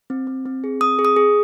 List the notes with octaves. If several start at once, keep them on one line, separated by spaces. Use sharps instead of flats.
C4
C4
C4
G#4
C4 D#6
G#4
D#6
G#4